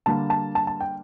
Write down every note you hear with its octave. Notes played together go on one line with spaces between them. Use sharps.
D3 G3 A#3 A5
A5
A5
A5
G5